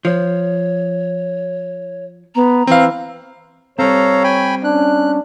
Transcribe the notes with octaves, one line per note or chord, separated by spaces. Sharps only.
F3 C#5
B3 A#5
E3 C4 F5
G3 C4 A4 C#5 F5 A#5
G5 G#5 B5
C#4 D4 F#6